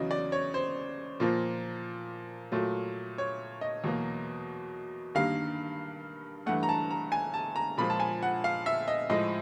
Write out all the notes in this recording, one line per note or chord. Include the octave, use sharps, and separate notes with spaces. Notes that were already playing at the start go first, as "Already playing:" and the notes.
Already playing: E2 C#3 F#3 D#5
D5
C#5
C5
A#2 F3 A#3
A#2 F#3 A3
C#5
D#5
E2 B2 F#3 A#3
G2 D#3 G3 A#3 F5
G2 E3 A3 F#5
A#5
A5
A#5
G#5
A5
A#5
A#2 F3 G#3 B5
A5
G#5
F#5
F5
E5
D#5
A2 F3 G#3 D#5